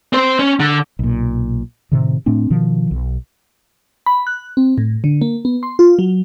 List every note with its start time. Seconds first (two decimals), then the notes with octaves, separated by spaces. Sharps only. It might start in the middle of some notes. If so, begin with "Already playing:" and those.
0.13 C4 C5
0.39 C#4
0.60 D3
0.99 B1 A#2
1.92 A2 C3 D#3
2.26 A2 A3 C4 D4
2.50 B2 D#3 F3
2.91 B1
4.06 B5
4.27 F#6
4.57 C4
4.78 A2
5.04 D3
5.22 A#3
5.45 B3
5.63 C6
5.79 F4
5.99 F#3